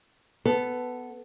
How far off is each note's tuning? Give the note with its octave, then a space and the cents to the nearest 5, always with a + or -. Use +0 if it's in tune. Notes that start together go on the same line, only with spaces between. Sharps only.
B3 +10 A4 +0